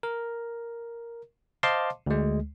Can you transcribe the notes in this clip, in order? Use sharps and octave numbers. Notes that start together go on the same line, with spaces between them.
A#4
C5 D#5 F5 A5 C6 D6
D2 G#3